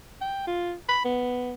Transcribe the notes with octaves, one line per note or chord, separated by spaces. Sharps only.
G5
F4
B5
B3